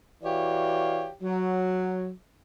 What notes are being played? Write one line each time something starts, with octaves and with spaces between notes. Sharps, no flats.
E3 F#4 G4 C#5 D5 F5
F#3